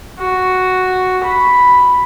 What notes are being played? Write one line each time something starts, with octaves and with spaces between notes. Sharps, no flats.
F#4
B5